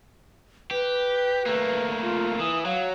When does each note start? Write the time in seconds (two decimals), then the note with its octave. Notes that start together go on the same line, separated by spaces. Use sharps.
0.71 G4 B4
1.46 A3 A#3
2.02 F4
2.40 E3 D#6
2.65 F#3 F5